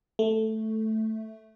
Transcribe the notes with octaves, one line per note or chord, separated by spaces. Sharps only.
A3